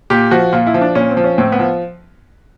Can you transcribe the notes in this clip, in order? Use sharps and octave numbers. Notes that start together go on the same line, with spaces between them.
A#2 G4
F3 F#4
A#2 F4
E4
F3
D4
A#2 C#4
C4
F3
C#4
A2 C4
B3
F3